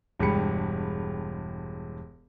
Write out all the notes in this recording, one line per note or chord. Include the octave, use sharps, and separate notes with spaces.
E1 G2 G#3 G5 B5 C#7